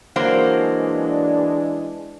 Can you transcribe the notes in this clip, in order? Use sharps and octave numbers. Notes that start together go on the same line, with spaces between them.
E3 F#3 G#3 A#3 D4 C5